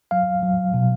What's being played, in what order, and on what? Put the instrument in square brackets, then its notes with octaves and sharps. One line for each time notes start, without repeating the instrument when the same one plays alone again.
[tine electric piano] F#3 F5
F#3
B2